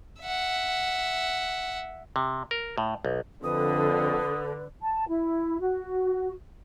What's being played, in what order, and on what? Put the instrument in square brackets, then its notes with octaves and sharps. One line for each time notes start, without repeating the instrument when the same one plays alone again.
[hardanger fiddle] E5 F#5
[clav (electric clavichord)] C3
A#4
A2
B1
[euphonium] F2 [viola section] D3 [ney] B4 [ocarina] D#6
[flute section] A5
E4
F#4